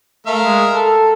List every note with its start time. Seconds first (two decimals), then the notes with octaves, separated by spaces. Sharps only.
0.26 A3 A#4 E5 F5
0.44 G#3
0.74 A4